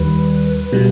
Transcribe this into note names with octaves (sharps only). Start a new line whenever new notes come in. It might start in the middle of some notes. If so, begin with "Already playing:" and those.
Already playing: D#2 D#3 G3 B4
B2 G3